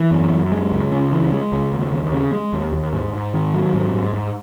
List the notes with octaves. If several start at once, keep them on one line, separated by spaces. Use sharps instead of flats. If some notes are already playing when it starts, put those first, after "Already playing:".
Already playing: E3
F#2
F#2
G#3
C#2
C#3
E3
G#3
C#2
D#2
D#2
C#3
G#3
D#2
D#2
G#2
G#2
D#3
F#3
G#2
G#2
G#2